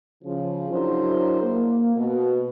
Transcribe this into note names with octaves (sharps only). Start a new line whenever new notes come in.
C#3 F3
F#3 D4 E4 G#4 A#4 C5
A#3
B2